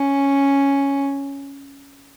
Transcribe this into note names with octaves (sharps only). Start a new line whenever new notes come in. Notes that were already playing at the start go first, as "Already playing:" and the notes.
Already playing: C#4